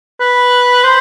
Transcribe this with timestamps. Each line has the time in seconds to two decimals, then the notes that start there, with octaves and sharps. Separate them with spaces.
0.20 B4
0.84 C5